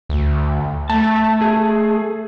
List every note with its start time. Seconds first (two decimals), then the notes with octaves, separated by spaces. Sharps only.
0.09 D2
0.90 A3 A5
1.42 G#4